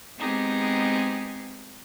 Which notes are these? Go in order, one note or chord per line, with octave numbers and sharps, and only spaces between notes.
G#3 B3 C4 D#4 G4 G#4